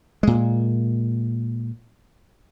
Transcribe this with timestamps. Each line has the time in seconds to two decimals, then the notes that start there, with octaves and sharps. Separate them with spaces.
0.23 A#2 G#3